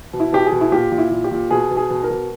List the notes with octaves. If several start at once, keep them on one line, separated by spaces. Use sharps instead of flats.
B2
E4
B2 G4
G#4
B2
E4
A#2 G4
A#2
E4
A#2
G4
A#2
B2 G#4
B2
G#4
B2
A#4
B2